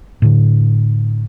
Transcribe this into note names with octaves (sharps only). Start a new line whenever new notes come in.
A2 D3